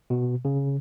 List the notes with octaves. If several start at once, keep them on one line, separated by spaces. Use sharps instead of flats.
B2
C#3